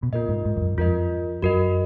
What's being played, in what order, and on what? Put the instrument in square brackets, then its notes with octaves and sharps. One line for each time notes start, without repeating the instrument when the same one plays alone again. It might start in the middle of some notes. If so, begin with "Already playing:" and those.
[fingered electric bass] B2
[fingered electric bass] A#2 [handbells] F4 A#4 D#5
[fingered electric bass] G#2
G#2
F2
F#2
[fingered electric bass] F2 [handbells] F4 A#4 D#5
[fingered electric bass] F#2 [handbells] F#4 A#4 D#5